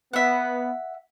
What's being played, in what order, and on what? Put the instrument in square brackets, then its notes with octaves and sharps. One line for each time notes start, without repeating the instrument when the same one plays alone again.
[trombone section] B3 [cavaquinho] E5 F#5